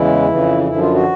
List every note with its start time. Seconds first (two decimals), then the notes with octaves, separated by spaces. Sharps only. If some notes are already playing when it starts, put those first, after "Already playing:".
Already playing: E2 C#3 E3 G#3 E4
0.29 F2 C#3 E3
0.68 F#2 D3 F3 E4
0.81 F4
0.94 F#4